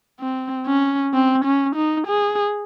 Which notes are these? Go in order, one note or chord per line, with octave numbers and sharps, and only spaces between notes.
C4
C#4
C4
C#4
D#4
G#4